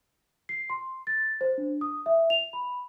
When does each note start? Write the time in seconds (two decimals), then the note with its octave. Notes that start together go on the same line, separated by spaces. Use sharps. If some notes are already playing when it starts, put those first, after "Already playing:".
0.49 C7
0.70 C6
1.07 A6
1.41 C5
1.58 D4
1.81 D#6
2.06 E5
2.30 F7
2.53 B5